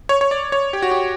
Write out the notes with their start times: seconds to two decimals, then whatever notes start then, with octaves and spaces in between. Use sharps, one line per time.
0.09 C#5
0.21 C#5
0.31 D5
0.52 C#5
0.73 G4
0.82 F#4
0.91 G4